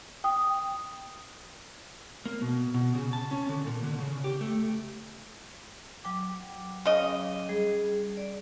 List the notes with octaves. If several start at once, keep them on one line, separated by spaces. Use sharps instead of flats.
G5 D#6
A#3
B2
B2
C#3
A5
C#4
D3
A#2
D3
C#3
G4
A3
F#3 G5 D6
C#3 D#5
G3 G#4
D5